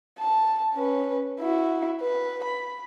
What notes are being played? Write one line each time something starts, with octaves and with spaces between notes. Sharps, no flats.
A5
C#4 B4
E4 F#4
B4
B5